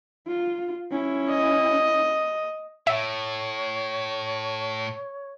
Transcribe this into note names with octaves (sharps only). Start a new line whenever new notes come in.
F4
C#4 E4
D#5
A2 C#5 E5